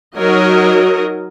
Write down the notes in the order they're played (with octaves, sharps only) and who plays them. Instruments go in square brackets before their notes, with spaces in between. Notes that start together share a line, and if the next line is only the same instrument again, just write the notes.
[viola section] F#3 D#4 F#4 A#4 C#5 D#5